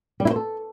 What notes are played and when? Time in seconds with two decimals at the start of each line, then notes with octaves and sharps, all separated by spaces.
0.20 G3
0.25 E4
0.30 C5
0.36 A4